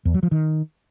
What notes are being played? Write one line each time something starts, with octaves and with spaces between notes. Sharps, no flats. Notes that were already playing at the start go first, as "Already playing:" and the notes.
E2
F#3
F3
D#3